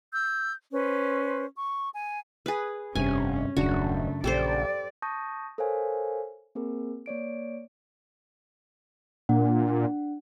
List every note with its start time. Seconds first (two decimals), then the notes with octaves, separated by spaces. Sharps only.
0.12 E6 G6
0.71 C#4 B4 C5
1.55 C#6
1.93 G#5
2.46 G#4 B4
2.95 F1 G2 C3 C#4 G#5
3.57 D#1 F#2 C#3 A3 D4 F#4
4.24 A#1 G4 A4 C5 D5
5.02 A5 C#6 D#6 G6 A#6
5.58 A4 A#4 C5 C#5 F5 G#5
6.55 A#3 C4 G#4 A#4
7.06 A#3 C#5 D5 D7
9.29 A#2 D4 F#5